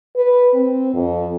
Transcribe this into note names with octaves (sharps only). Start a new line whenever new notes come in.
B4
C4
F2